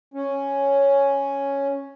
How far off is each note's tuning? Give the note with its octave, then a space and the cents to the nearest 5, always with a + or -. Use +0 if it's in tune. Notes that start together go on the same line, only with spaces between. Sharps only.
C#4 +0